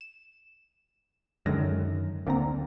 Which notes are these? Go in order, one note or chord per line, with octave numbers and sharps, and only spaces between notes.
E7
F#2 D3 D#3 G#3 A#6
D2 D3 A#3 C4 A#5